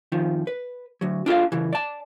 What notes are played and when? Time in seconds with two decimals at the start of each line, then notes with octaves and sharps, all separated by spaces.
0.12 F2 D#3 F3
0.47 B4
1.01 D2 F#3
1.26 D4 F4 A4 F5
1.52 C#3 E3
1.73 D5 A5